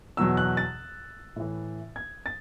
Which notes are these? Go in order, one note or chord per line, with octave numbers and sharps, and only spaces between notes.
E2 B2 F#3 E6
F#6
A6
A2 E3
G#6
A6